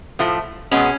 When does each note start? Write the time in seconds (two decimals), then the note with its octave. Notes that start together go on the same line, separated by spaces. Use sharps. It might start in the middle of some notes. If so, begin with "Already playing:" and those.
0.19 A2 F3 A3
0.71 B2 G#3 B3 C#4